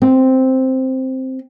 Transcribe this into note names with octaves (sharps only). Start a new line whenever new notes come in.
C4